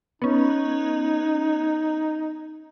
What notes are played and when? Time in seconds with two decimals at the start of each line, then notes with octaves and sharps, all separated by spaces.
0.22 B3 C#4 D#4